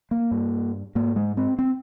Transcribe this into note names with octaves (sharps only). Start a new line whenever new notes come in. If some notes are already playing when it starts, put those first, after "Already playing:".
A#3
G2
G#2 A#3
G#3
C4
C4